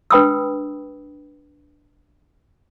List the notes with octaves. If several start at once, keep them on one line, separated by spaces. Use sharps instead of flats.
D4 B4 G5 B5 D#6 E6